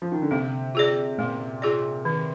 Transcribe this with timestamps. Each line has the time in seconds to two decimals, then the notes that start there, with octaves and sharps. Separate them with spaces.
0.02 F3
0.12 D#3
0.22 D3
0.31 C3 A#3
0.75 F4 G#4 D5
1.18 A#2 A#3
1.62 F4 G#4 D5
2.05 D#3